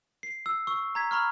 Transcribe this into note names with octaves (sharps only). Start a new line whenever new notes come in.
C7
E6
C#6 E6
A#5 G#6 B6
A#5 B5 C#6 F6